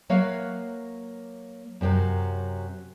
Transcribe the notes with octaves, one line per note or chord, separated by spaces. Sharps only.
F#3 A#3 B4 C#5 E5 F5
F#2 C3 D#3 F#3